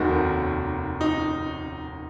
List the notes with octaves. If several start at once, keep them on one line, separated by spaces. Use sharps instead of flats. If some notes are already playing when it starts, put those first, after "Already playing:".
Already playing: F1 D#2 D#3 A#3 F#4
D#4